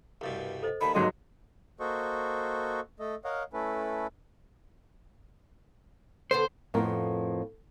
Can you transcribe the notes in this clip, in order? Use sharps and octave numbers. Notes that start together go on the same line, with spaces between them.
C2 G2 B2
A4 C5 D#5
D#2 D#3 D5 A5 B5
G#1 F#3 G4 G#4 D5 D#5 C6
A#3 F#4 A4 C5 D#5 C#6
A3 A4 D#5
A#4 C#5 D#5 F5 F#5
A3 C#4 E4 A4 B4
D3 B3 A4 C5
F2 A2 F3 B3 A#4